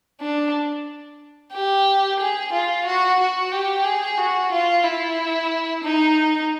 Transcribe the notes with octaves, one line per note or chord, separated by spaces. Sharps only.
D4
G4
G#4
F4
F#4
F#4
G4
G#4
F#4
F4
E4
D#4